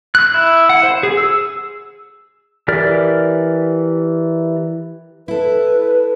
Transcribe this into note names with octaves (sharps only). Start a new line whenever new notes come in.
F#6
E4
F#5
C5
G#4
E6
E3 G4 A#4 D5 F6
E4 A4 B4